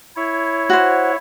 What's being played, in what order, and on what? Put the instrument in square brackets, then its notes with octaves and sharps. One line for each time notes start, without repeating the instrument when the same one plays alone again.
[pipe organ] E4 C#5
[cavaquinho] F#4 C5